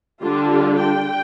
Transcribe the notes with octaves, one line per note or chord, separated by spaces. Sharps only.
D3 G3 D4 F4
F4
G5